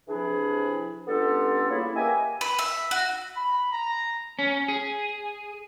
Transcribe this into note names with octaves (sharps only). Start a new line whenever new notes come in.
C3 E3 F3 D4 E4 G#4
G3 B3 C#4 D4 F4 A4
C#3 A#3 E4
A#3 G4 B4 D#5 E5 G#5
B4
E5
F#4
B5
A#5
C#4
G#4